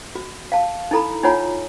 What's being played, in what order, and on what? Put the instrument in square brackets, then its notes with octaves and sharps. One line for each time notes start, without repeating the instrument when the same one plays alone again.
[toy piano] F#4
F5 A5
D#4 E4 A4 A#5 B5
D#4 F4 C#5 F#5 G#5 A#5